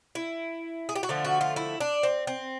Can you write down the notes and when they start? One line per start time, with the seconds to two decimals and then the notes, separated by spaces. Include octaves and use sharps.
0.15 E4
0.89 G#4
0.95 G4
1.03 F#4
1.09 D3 F3 A3 F4
1.25 F#4
1.41 F4
1.56 E4
1.80 D4
2.03 C4
2.27 C4